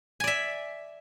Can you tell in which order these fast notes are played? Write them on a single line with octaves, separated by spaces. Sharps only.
G#5 D5 E5